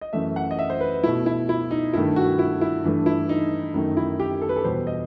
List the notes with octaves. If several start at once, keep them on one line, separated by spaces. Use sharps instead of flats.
D#5
F#2 E3 A3 E5
F#5
D#5
E5
C5
B4
B2 A3 E4
E4
E4
D#4
G2 D#3 A3 E4
F#4
E4
E4
G2 E3 A3
E4
D#4
F#2 D#3 A3 D#4
E4
G4
A4
B4
A4
E2 B2 G3 C5
D#5